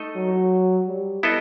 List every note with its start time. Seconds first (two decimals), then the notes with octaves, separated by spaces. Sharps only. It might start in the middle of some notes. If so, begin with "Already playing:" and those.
Already playing: A3 D#4 A4 D#5
0.16 F#3
0.88 G3
1.23 B3 E4 A4 D#5